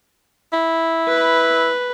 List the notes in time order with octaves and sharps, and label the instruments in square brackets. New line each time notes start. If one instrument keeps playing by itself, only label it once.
[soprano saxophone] E4
[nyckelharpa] B4